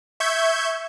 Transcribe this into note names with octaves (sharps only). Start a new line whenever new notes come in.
E5 C#6 G6 G#6